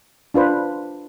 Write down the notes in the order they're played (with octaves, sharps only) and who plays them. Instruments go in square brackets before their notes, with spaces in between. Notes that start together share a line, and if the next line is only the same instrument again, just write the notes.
[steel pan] D4 F4 B4 C5